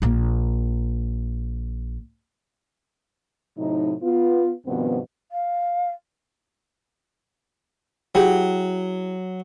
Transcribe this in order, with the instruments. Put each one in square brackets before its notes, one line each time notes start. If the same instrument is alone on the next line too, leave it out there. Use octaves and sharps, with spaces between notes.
[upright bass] A#1 A#3
[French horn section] A2 C3 F#3 D#4
B3 F4
G2 B2 D#3 F3 B3 C4
[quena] F5
[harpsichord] F#3 [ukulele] E4 G4 G#4